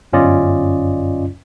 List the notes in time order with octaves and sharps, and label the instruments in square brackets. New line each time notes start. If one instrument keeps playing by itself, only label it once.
[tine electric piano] G1 F#2 C#4 F4 D5 D#5